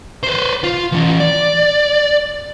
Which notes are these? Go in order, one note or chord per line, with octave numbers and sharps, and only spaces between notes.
B4 C5
F4
E3 C#4
D5